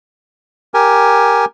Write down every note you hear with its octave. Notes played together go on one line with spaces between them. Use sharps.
G4 A#4 G#5